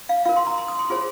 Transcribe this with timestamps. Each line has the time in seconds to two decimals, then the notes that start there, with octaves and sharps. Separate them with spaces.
0.09 F5
0.25 F4 A#4 F5
0.36 C6
0.47 A#5
0.58 C6
0.68 D#6
0.79 C6
0.90 F4 G#4 C5